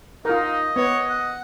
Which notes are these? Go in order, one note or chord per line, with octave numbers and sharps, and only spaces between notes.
D#4 F4 A#4 D#5
B3 C#5
F#5